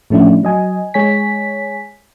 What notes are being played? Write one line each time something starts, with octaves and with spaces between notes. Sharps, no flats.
A2 F3 A3 C#4 D4 E4
F#3 D#5 G#5
G#3 C#5 G#5 B6